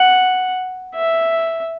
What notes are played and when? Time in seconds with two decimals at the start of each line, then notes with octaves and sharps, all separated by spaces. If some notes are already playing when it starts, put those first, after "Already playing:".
Already playing: F#5
0.95 E5